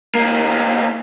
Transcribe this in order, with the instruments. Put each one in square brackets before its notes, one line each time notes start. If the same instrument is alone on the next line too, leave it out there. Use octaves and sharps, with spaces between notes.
[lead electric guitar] D2 A#3